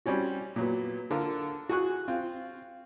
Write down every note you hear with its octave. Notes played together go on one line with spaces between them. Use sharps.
G3 C4 C#4 F#4
A#2 F#3 B3
D3 F4 A4 A#4
F#4 G#4 G#5 C#6 F#6
C4 F4